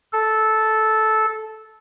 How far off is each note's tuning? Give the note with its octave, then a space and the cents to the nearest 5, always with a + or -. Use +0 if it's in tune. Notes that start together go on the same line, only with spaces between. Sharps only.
A4 -10